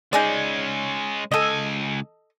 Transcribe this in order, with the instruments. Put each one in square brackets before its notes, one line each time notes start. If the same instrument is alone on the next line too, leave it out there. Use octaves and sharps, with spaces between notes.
[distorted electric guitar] G#3 C#4 [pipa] D#4 G#4 D5
[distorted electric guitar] C#2 G#5 [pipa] A4 D#5